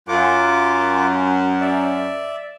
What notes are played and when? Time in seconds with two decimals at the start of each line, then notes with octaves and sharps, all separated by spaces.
0.08 F#2 F4 D6
1.60 D5 E5